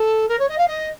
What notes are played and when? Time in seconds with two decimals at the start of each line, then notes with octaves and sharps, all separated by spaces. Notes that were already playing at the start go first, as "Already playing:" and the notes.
Already playing: A4
0.29 A#4
0.39 C#5
0.49 D#5
0.58 F5
0.68 D#5